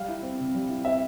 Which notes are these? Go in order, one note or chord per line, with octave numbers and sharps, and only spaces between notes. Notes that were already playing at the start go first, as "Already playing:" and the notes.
Already playing: G3 F5
E4
C4
C3
G3
E4
C4 E5